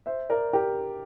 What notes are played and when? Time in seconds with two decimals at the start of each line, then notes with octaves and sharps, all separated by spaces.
0.06 C5 E5
0.30 A#4 D5
0.53 G4 A#4